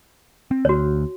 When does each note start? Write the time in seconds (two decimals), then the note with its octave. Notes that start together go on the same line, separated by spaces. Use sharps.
0.51 C4
0.65 D2 F#4 C#5